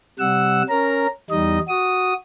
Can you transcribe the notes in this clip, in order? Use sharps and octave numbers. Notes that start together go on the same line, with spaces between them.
C3 G3 F#5 E6
C#4 A#4 A#5
E2 G3 D#4 D#5
F#4 D#6